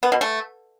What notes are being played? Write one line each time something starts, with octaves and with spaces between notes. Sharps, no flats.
B3
B2
A3